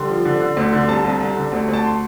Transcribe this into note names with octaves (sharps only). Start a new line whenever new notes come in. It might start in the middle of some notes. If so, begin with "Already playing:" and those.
Already playing: D3 G3 C6
F3
D3
D3
D2
D3
C2 A5
C2
C2
D3
D2
D2
A5
C6